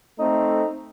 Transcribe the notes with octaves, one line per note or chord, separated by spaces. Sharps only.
A3 C4 D#4